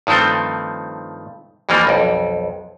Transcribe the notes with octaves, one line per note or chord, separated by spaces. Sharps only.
G2 D#3 F3 A3 C4
F2 E3 F3 G3 A#3
B1 F2